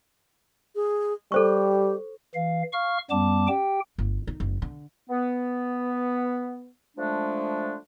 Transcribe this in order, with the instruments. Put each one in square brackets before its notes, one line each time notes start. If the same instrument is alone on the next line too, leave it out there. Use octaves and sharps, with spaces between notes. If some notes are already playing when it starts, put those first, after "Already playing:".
[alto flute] G#4
[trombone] G3 [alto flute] G4 [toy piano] A4 C5 C#6
[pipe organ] E3 F5
F5 C#6 F6
F#2 G3 B3 A5 D6
G4 G5
[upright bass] G1
D#4
F#1
D3
[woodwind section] B3
D3 F3 G#3 A3 D4